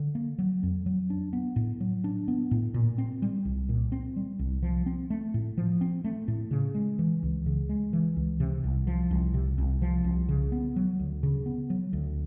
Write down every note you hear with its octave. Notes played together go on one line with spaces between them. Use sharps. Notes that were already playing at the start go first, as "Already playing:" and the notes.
Already playing: D3
A#3
F#3
F2
F#3
D4
B3
A2
F#3
D4
B3
A2
A#2
C4
G3
C2
A#2
C4
G3
C2
F3
C4
A3
A2
F3
C4
A3
A2
C#3
G#3
E3
C#2
C#3
G#3
E3
C#2
C3
C2
F3
C2
C3
C2
F3
C2
C#3
B3
F#3
D2
C#3
B3
F#3
D2